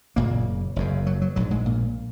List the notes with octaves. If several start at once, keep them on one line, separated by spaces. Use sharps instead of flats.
F#1 F#2 A#2 C#3 A#3
F#1 F#2 C#3
F#3
F#3
A#1 G#2 F#3
G#2 G#3
A#2 A#3